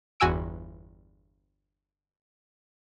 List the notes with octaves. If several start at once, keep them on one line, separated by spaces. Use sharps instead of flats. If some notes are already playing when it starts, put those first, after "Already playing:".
G1 E2 F#4 G#5 E6 D7